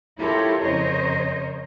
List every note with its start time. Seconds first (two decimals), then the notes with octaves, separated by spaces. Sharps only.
0.18 E4 F4 G4 A4 A#4 C#5
0.60 F2 C#3 A#4 C5 C#5 D#5